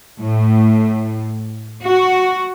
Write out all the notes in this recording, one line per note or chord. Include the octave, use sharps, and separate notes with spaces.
A2
F#4